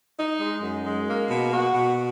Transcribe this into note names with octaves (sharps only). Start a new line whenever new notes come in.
D#4
G#3
F#2
G#3
A#3
B2
F#4
B2